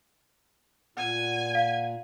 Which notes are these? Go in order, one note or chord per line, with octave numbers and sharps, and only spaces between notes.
A#2 F#5 G#5
F5